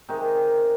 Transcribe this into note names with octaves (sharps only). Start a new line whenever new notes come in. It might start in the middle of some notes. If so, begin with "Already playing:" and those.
C3 D#3 G#3 D#4